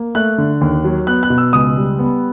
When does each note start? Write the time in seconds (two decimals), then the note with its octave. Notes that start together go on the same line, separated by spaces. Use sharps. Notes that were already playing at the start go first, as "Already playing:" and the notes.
Already playing: A#3
0.15 A3 F#6
0.38 D3
0.61 D#2
0.84 F#3
1.07 B3 F#6
1.23 F#6
1.30 B2
1.38 E6
1.53 C#2 D#6
1.76 G3
1.99 B3